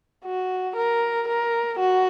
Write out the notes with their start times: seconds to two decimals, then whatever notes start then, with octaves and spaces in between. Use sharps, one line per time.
0.25 F#4
0.76 A#4
1.28 A#4
1.79 F#4